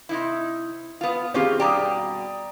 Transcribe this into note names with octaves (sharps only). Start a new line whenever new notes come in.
C3 D#4 E4
B3 F4
D#3 C4 C#4 F4 G4 G#4
G2 B2 G4 D5 A#5 D#6